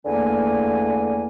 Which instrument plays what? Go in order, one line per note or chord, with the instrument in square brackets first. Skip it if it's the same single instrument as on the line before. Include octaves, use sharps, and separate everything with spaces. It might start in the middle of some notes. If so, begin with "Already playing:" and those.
[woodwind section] E2 D3 A3 A#3 G#5